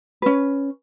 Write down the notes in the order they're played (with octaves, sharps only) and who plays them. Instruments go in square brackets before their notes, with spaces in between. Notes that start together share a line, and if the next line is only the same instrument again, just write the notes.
[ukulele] C#4 B4